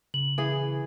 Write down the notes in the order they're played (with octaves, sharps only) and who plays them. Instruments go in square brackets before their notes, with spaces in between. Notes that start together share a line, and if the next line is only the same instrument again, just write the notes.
[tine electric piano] C#3 [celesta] F#7
[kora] E3 G#4